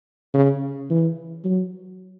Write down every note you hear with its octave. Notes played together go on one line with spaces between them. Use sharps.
C#3
E3
F#3